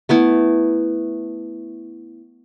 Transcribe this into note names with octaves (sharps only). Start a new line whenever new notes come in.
A3 B3 E4